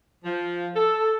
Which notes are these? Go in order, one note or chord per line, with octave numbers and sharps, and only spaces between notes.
F3
A4